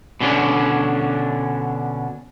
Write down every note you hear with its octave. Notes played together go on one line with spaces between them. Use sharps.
B2 D3 C#4 D4